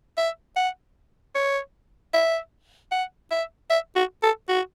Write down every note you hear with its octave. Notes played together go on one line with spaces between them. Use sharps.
E5
F#5
C#5
E5
F#5
E5
E5
F#4
A4
F#4